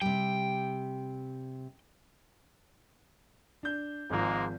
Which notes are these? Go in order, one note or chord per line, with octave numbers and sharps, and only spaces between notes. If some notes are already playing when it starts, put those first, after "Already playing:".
C3 G3 G5
D4 G6
G#1 G#2 F3 G#3 A#3